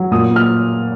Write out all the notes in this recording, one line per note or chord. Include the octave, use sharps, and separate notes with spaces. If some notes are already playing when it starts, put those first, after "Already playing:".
Already playing: F#3
A#2 D#6
A#3
F6